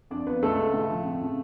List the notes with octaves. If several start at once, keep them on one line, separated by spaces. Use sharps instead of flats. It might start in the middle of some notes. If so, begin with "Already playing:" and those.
F2 D4 D5
F3 B3 B4
C#2 A3 A4
C#3
A2
F3
F2
C#3